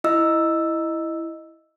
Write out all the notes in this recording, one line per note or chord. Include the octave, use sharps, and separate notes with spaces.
E4 D#5 E6